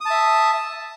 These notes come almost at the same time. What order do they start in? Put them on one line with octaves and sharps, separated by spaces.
D#6 A5 E5